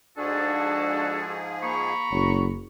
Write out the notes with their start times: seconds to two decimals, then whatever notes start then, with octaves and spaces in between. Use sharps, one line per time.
0.18 G#2 F3 D4 F#4 G#4 A4
1.63 A#3 A#5 B5 C#6
2.12 F#1 F#3